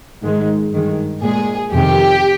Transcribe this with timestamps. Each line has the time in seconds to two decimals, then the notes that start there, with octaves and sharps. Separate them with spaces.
0.23 G#2 D#3 G#3
0.72 G2 D#3 G#3
1.22 A#2 G#3 G#4
1.73 F2 C3 D#3 G4